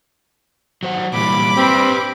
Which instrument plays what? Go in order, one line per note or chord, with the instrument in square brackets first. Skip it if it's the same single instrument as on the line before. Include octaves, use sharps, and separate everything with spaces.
[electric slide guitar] F#3 C5 F#5
[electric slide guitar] A#2 E3 G3 [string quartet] B5 D6
[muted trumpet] C4 [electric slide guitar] G4 B4